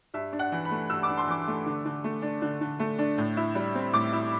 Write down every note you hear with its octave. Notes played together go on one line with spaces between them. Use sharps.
G2 E5
D4
F#5
E3
B5
A3
G2 E6
D6
D4
C6
E3 D6
A3
D3
D3
A3
D4
D3
D3
A3
D4
A2
E4
G3
C4
A2 D6
E4